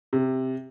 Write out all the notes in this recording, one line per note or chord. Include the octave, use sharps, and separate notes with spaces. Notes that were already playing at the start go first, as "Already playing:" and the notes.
C3